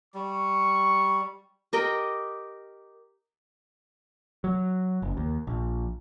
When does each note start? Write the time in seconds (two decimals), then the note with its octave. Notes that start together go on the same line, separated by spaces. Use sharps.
0.14 G3 C#6
1.73 G4 A#4 D#5 G5
4.44 F#3
5.02 F#1
5.17 D#2
5.47 A#1